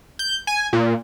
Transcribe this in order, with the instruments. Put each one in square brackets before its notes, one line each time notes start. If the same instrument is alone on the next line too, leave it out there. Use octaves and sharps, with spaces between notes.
[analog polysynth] G6
G#5
A#2